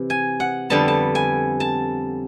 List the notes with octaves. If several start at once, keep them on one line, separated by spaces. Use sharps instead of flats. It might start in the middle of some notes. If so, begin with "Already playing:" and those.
Already playing: C3 E3
G#5
F#5
F2 D3 G3 B3 A5
A5
G#5
A5